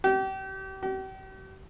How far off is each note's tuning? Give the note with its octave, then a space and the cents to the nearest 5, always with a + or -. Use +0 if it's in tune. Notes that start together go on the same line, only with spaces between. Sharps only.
G4 -35
G4 -45